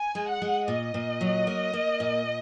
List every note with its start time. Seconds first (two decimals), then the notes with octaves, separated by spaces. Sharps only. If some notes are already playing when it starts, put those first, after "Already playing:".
Already playing: G#5
0.15 G#3
0.28 F#5
0.42 G#3
0.68 A#2 D#5
0.94 A#2
1.21 F#3
1.47 A#3
1.73 A#3
2.00 A#2